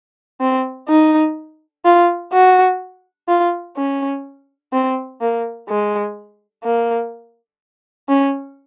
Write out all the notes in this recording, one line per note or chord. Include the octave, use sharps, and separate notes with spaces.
C4
D#4
F4
F#4
F4
C#4
C4
A#3
G#3
A#3
C#4